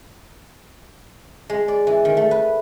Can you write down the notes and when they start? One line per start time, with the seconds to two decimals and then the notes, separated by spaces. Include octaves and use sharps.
1.50 G#3
1.68 D5
1.87 E3
2.05 D#3
2.17 A3
2.31 B4